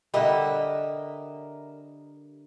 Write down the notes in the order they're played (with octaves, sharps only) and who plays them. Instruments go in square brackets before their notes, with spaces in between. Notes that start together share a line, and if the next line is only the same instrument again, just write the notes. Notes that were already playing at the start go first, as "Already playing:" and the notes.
[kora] D3 G3 [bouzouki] A#4 D#5 E5